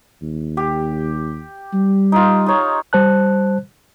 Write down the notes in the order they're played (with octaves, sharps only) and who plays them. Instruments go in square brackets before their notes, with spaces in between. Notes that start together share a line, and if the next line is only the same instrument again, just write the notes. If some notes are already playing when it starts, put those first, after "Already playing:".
[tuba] D#2
[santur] G4
[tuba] G3
[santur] D#4 F4
D#4 C#5
[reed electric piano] G3 C5 A5 F#6